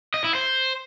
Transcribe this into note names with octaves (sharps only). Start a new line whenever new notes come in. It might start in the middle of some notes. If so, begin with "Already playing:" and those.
D#5
E4
C5